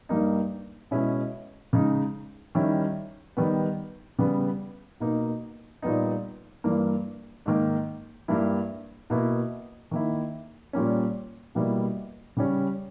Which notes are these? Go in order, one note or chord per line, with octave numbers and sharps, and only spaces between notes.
G2 G3 A#3 D#4
B2 G#3 C#4 E4
C#3 G#3 D#4
D#3 G3 C#4 E4
D#3 G3 B3
C#3 G3 B3
B2 A#3 D#4
A#2 G3 B3 D#4
G2 E3 A#3
G#2 D#3 A#3
G2 G3 A#3 E4
B2 A#3 E4
D#3 A#3 E4
A#2 G3 A#3 C#4
B2 G3 A#3 E4
C#3 G3 C#4